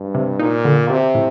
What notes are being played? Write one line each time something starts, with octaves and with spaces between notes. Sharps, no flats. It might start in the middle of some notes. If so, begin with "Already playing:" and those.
Already playing: G2
C3
A#2 D#4
D3
C3 G4
A2